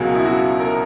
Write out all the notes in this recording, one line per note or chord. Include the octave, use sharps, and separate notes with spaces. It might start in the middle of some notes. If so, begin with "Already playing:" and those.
Already playing: C#2 B2 F#3 F#4 G#4 A#4
E4
F#4
A#4